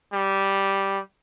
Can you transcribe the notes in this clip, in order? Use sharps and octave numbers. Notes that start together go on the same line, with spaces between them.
G3